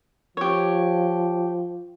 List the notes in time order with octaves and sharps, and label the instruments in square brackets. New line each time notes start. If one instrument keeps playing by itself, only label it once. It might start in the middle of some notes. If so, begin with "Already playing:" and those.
[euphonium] F3 [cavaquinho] G4 C#5